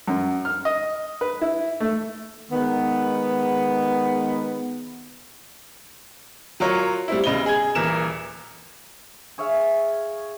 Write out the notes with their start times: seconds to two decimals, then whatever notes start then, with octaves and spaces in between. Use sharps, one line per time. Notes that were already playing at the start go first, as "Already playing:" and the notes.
0.08 F#2
0.45 F6
0.65 D#5
1.21 B4
1.41 E4
1.80 A3
2.52 D#3 G#3 B3
6.60 F#3 F4 A#4 C#5
7.08 G3 C4 E4
7.24 E1 C#3 D#5 G7
7.46 G#4 G#6
7.75 D#1 E3 A#4 E7
9.38 G#4 C#5 E5 F5